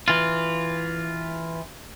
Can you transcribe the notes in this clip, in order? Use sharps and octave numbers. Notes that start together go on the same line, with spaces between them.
E3 F4